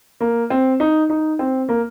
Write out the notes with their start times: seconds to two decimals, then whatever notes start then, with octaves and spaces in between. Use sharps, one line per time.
0.20 A#3
0.50 C4
0.80 D#4
1.10 D#4
1.39 C4
1.69 A#3